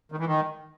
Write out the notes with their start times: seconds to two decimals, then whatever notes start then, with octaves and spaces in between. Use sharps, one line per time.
0.12 D#3
0.19 E3
0.26 D#3